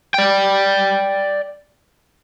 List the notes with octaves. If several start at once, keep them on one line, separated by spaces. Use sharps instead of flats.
D5 G5